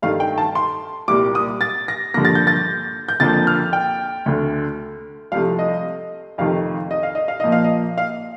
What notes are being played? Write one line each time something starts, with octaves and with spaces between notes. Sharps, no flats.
G2 D#3 A3 F5
G5
A5
C6
C2 A#2 G3 A#3 D6
D#6
A6
A#6
G2 D3 F3 A#3 A#6
A6
G6
A6
G6
F2 D3 F3 A#3 A6
F6
G5
D2 D3 A3
C2 C3 F3 A3 F5
D#5
F2 C3 D#3 A3 F5
D#5
F5
D#5
F5
A#2 F3 A#3 D#5
F5
D#5
F5